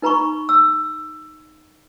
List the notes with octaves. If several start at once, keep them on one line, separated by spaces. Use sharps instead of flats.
D#4 B4 A#5 B5 C#6
E6